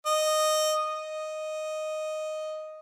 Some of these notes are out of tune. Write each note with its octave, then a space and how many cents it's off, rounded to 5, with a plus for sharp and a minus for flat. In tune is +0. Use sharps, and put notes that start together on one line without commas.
D#5 -10
D#5 -5